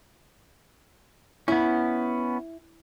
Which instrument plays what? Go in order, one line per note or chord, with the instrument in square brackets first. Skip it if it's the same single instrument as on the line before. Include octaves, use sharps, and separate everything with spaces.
[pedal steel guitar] B3 C#4 [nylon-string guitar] E4